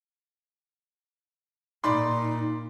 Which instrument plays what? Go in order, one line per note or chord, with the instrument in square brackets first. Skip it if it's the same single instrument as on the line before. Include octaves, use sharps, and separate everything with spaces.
[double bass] A#2 [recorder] D#4 [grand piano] D5 B5 C6